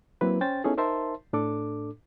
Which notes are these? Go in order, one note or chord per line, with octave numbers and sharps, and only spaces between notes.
F#3 A#3 C4 E4 B4
C#4 C5 G5 A6
B3 C#4 D#4 E4 G#4 A4
D#4 A#4 C5 E5 A5 C6
A2 D4 A4 D6